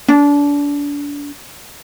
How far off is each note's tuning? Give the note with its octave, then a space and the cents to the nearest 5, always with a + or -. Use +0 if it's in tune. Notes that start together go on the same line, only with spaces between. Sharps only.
D4 -30